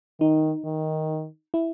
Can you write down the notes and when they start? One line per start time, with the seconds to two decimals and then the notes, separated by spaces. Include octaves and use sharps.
0.20 D#3 D#4
0.64 D#3
1.54 E4